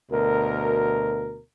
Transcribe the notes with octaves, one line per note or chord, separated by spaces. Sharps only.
D2 B2 A#4